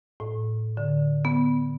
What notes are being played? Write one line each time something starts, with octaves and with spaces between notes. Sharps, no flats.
A2
D3
B3